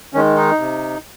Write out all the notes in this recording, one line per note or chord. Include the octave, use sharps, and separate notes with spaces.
D#3 G#3 C#4
D#4
C3